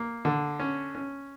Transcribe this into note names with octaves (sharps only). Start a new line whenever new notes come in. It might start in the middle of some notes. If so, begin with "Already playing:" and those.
Already playing: A#3
D3
C#4
C#4